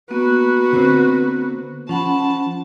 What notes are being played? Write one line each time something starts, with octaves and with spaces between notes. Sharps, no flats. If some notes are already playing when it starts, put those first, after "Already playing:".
A#3 B3 F#4 B4
D3 C4
F3 C#4 F#5 A5 B5